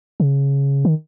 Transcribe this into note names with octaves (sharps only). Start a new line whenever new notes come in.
C#3
D#3